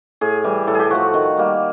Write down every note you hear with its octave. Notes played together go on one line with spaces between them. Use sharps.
A2 G#4
E3 G3
A2 A4
G4 G#4
F3 A3 F#4
D#3
G3 A#3